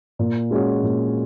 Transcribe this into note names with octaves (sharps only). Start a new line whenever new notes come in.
A#2
G#3 C#4 F#4
A#2